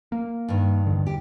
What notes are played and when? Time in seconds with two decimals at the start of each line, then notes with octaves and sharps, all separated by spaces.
0.12 A#3
0.48 G2 D#3
0.86 E2 D3
1.07 G4